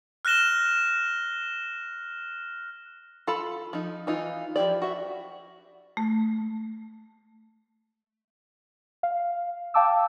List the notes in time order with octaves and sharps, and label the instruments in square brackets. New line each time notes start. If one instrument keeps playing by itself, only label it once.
[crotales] F6 F#6 A#6 E7 G7
[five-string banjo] F4 A4 B5
F3 D#4
E3 D#4 F4
F3 E4 G4 D5
F#4 E5
[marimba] A3
[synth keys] F5
F5 G5 A5 D6 E6